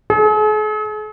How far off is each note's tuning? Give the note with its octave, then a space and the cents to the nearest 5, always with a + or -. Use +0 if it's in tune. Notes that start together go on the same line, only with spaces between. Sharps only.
G#4 +45